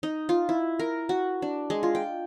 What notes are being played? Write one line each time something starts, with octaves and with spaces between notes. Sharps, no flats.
D#4
F4
E4
A#4
F#4
D4
G#3
F4
G5